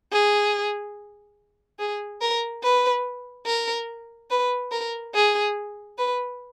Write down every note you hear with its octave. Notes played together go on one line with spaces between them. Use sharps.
G#4
G#4
A#4
B4
A#4
B4
A#4
G#4
B4